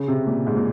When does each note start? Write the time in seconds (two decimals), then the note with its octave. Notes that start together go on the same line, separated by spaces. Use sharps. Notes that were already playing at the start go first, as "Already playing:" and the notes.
Already playing: C#3
0.08 C3
0.27 A#2
0.47 G#2
0.57 A#2